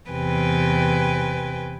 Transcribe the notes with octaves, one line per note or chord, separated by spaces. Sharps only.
E2 C3 B4 G5 G#5